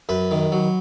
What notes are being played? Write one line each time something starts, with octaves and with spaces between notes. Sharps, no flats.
F#2 B4
D#3
F#3